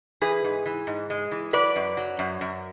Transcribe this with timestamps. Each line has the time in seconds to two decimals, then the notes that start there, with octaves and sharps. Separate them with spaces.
0.22 E3 G#4 B4
0.44 G#2
0.66 E3
0.87 G#2
1.10 G#3
1.31 E3
1.53 F#3 B4 D5
1.76 F#2
1.97 F#3
2.19 F#2
2.41 F#2